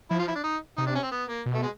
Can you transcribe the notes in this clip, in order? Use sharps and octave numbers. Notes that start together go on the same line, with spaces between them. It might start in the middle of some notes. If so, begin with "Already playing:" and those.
F3 E4
F4
E4
D4
D#4
C3 D#4
D4
C#4
C4
B3
A#3
B2
A3
G#3